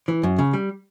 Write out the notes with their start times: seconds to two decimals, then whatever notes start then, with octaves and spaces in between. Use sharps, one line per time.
0.08 E3
0.23 F#2
0.39 C#3
0.54 G3